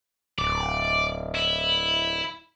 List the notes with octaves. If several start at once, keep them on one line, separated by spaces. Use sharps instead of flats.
D1 D5
E4